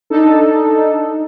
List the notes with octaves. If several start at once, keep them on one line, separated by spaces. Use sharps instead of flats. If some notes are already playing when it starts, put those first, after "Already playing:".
D4 D#4 A4